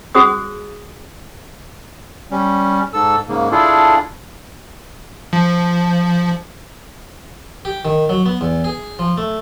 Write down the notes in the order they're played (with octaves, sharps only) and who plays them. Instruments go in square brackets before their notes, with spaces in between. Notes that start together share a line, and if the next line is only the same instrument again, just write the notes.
[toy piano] F#4 G#4 C5 D#6
[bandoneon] G3 C#4
G#2 A4 E6
G#2 C#3 A#3
D4 E4 F4 G#4 A4
[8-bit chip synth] F3
[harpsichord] G4
D#3
F#3
B3
E2
G#4
F3
A3